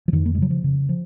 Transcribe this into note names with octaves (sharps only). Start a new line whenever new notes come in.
F3
F2 D#3
A#3
G#3
C#3 F#3
F3
C#3
F3